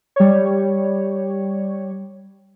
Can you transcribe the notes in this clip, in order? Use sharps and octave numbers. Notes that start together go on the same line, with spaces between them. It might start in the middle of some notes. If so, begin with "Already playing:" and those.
G3 C#5